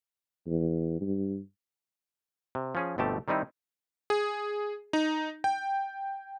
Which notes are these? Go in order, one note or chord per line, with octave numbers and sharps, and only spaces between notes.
E2
G2
C3
F3 C#4 G#4
G1 B2 A3 C4 G4 A5
D#3 G3 C4 D#4 E4
G#4
D#4
G5